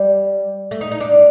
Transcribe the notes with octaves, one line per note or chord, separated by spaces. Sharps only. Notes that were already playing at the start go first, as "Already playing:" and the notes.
Already playing: G3
A3
D#4
D#4
D4